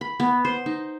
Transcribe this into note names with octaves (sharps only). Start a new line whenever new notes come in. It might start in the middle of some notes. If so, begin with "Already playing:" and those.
B5
B3
C5
D#4